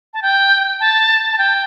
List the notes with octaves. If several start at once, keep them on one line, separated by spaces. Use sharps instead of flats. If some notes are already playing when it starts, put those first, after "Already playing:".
A5
G5
A5
A5
G5